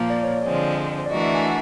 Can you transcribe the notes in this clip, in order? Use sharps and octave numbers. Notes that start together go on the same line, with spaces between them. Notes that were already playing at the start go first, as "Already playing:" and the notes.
Already playing: A#2 F3 A#3
D5
C#5
D5
D3 F3 G#3 C4
D5
E3 A3 D4 F#4 A#4 D#5
E5
G#5
F#5